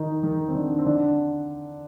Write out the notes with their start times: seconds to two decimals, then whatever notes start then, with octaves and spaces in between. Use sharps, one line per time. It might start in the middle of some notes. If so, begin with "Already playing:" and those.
Already playing: D#3 D#4
0.23 D#3 D#4
0.48 C4
0.55 D3 D4
0.79 C4
0.86 D3 D4